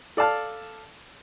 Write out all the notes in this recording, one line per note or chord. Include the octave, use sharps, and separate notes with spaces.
A4 D5 F5 A5 F6